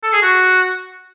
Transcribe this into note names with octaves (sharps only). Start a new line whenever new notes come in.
A4
G#4
F#4